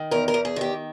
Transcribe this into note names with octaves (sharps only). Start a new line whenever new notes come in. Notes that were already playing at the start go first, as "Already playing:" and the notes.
Already playing: D#3
E2 A#4
A#4
E2
G#4
D#3 G4